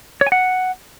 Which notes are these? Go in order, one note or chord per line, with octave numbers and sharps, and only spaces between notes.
C#5
G#5
F#5